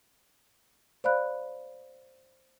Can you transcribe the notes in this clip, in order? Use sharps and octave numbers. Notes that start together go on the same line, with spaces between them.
C5 D5 F5 B5 F#6